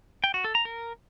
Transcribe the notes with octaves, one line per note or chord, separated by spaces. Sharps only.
G5
F#4
A4
A#5
A#4